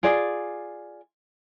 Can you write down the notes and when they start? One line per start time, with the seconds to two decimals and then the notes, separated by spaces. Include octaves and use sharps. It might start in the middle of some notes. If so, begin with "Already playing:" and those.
0.03 F4 G#4 D5